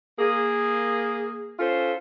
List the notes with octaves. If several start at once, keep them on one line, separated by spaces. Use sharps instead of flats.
A#3 G#4
C#4 F4 A4 C5